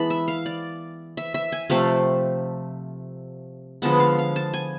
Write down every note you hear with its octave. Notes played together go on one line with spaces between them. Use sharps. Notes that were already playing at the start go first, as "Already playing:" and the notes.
Already playing: E3 G#3 B3 A5 B5
E5
F5
D5
E5
E5
G#5
C3 F3 A3 F5
D3 F3 G#3 B3 A5
F5
F5
A5
G#5